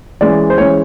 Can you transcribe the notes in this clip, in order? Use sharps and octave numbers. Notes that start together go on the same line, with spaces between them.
E3 G#3 C#4 D5
C5
E3 G#3 C#4 C#5